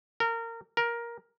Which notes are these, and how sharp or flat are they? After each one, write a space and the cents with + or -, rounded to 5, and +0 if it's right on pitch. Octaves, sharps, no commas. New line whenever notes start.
A#4 -25
A#4 +10